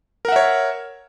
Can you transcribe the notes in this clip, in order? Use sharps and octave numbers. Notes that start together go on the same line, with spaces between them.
A#4 C#5 E5 F#5